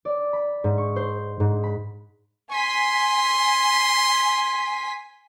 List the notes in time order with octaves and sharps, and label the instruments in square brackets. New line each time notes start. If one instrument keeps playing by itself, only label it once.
[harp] D5
B5
G#2
C#6
C5
G#2
B5
[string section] G#5 B6 [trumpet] C6